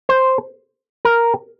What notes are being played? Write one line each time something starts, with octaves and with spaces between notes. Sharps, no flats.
C5
A#4